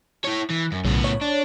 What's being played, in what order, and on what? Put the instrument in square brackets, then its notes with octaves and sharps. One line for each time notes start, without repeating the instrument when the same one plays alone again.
[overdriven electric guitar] E4 C#5
E3
F#2
[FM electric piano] B1 C#3 [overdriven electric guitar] A2 B3
[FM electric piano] C#5
[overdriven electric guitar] D4